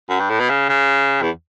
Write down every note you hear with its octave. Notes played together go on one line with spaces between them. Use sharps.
F#2
G2
A2
B2
C#3
C#3
E2